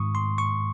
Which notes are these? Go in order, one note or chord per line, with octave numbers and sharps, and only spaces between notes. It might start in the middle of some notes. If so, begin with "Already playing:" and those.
Already playing: G#2 D#3 G#3 C#6 D#6
C6
C#6